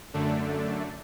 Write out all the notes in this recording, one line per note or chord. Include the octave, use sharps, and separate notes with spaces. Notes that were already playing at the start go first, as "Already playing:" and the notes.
F#2 D3 A3 D4